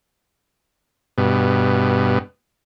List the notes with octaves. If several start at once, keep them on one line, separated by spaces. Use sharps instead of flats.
G2 B2